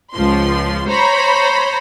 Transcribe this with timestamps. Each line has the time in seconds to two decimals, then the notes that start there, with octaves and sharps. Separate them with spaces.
0.14 C#2 F3 C6
0.88 C5 C#5 A#5 B5